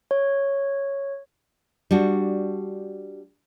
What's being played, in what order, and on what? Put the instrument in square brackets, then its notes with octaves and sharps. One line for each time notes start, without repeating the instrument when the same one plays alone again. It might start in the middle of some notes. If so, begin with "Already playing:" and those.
[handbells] C#5
[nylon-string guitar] G3 D4 F#4